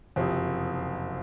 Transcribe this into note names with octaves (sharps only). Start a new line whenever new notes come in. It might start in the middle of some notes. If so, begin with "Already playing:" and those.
F#1 F2 C3